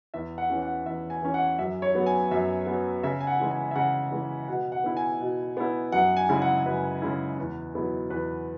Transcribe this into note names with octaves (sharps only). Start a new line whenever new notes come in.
E2 E5
F#5
E3 C#4
F#5
E2 E5
G#5
E3 C#4
F#5
F#2 E5
C#5
F#3 B3
G#5
F#2 E5
F#3 B3
C#3 E5
G#5
F#5
E3 G#3
G#5
E5
C#3 F#5
E3 G#3
B2 F#5
F#5
B3 E4
G#5
B2
B3 E4
F#2 F#5
G#5
C#3 G#3 E4
F#5
F#2 B4
C#3 G#3 E4
E2
B2 F#3 B3 E4
E2 B4